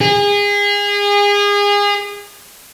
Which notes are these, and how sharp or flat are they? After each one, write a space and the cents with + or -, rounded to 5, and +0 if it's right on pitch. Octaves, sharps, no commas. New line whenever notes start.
G#4 -30